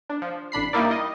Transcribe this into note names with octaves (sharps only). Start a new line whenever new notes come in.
D4
F3
A1 D4 B5 C7
G3 A#3 D#4 E4 A#4 D5
D#5